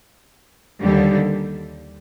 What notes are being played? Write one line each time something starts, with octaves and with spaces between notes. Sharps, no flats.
D#2 D3 G3